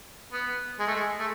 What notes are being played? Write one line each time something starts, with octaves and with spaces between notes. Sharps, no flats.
B3
G#3
A3
G#3
A3